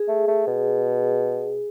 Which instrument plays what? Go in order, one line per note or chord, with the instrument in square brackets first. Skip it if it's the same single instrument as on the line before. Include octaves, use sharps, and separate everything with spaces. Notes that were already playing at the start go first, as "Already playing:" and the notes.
Already playing: [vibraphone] G#4
[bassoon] A3
A3
B2